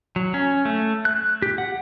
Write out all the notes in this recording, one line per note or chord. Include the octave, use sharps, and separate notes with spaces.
F#3
C#4
A3
F#6
G4
F#5